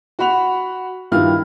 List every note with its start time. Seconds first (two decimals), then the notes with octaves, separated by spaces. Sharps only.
0.19 F#4 F#5 B5 F7
1.11 G2 D#3 E4 F4 F6